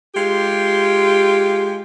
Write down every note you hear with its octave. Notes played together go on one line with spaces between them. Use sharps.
G#3 F4 G4